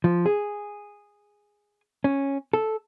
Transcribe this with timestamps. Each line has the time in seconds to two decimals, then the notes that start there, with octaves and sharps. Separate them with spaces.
0.04 F3
0.26 G#4
2.04 C#4
2.53 A4